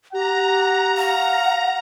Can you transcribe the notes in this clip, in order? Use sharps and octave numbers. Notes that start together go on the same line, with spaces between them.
G4 F#5 A#5
F5 F#5